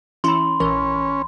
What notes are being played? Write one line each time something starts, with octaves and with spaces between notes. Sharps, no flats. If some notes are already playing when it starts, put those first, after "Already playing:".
E3 C#4 E4 B5 C6
A#1 E3 C#4 A#4